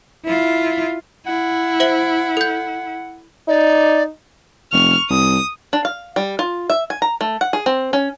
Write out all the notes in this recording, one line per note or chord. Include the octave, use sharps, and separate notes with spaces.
E4 F4
E4 F#5
C5 E5 F#7
A4 G6
D#4 D5
F1 C#6 F6
C2 D#6
D4
F5
G3
F4
E5
G#5
A#5
A3
F#5
G#4
C4
C#4